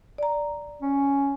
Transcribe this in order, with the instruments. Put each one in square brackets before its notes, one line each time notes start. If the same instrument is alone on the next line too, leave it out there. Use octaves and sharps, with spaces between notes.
[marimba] D5 A#5
[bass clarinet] C#4